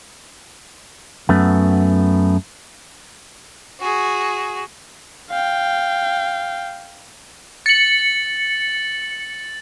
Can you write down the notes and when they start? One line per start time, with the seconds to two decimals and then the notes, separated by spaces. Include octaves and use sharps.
1.29 F#2 A3 B3
3.81 F#4 G#4
5.30 F5 G5
7.66 A6 C#7 F#7